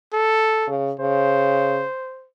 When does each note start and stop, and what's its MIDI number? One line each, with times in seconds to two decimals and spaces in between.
0.13 0.69 69
0.67 0.93 49
1.00 1.82 49
1.00 2.27 72